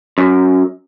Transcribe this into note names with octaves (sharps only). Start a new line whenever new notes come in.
F#2